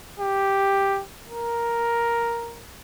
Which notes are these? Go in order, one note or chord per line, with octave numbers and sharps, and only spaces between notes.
G4
A#4